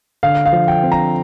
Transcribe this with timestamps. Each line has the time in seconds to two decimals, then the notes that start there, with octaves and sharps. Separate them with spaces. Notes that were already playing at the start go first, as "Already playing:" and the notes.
0.23 D3 F5
0.46 F5
0.53 F3
0.68 G5
0.83 C4
0.92 A#5